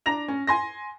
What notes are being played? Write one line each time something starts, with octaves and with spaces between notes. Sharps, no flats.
D4 A#5 A#6 F7
C#4
G#5 C6 A#6